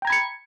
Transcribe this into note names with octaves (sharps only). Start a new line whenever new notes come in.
G5 A#5 B5 G#6 C#7